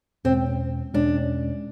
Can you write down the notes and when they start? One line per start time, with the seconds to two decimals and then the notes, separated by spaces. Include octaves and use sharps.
0.25 E2 B2 G#3 C4 C#4
0.94 E2 B2 G#3 C#4 D4